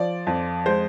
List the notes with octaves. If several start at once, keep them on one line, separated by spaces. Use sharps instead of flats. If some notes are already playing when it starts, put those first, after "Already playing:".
Already playing: F3 D5
F2
G#3 C5